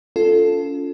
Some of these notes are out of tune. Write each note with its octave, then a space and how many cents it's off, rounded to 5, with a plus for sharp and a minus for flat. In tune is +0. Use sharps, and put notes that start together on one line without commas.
C#4 +35 F4 +0 A4 +0